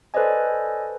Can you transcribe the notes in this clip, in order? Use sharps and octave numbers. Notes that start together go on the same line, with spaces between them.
A4 B4 C5 D5 D#5 G#5